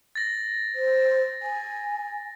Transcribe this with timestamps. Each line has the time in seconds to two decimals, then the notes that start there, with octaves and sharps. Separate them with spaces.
0.15 A6 A#6
0.75 C5
1.42 G#5